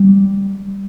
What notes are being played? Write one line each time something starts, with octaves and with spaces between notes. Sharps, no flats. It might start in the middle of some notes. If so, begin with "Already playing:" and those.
Already playing: G3